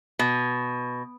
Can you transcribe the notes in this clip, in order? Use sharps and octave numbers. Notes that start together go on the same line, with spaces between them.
B2